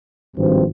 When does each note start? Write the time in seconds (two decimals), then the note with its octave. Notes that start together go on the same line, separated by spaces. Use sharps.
0.36 G#1 G2 F3 C4